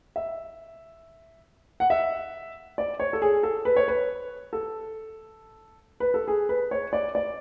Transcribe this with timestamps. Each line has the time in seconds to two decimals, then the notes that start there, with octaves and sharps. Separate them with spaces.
0.16 E5
1.80 F#5
1.90 E5
2.78 D5
3.00 C#5
3.13 A4
3.22 G#4
3.43 A4
3.65 B4
3.76 C#5
3.88 B4
4.53 A4
6.00 B4
6.14 A4
6.28 G#4
6.49 B4
6.71 C#5
6.93 D5
7.15 D5